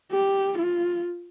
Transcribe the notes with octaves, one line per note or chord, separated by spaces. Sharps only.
G4
F4